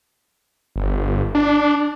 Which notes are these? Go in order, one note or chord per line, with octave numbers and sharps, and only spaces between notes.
G1
D4